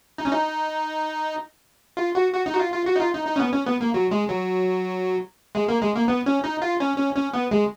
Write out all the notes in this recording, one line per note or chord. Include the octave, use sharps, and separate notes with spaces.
D#4
C#4
D#4
F4
F#4
F#4
D#4
F#4
F4
F4
F#4
D#4
F4
D#4
D#4
C#4
B3
C#4
B3
A#3
F#3
G#3
F#3
G#3
A#3
G#3
A#3
B3
C#4
D#4
F4
C#4
C#4
C#4
B3
G#3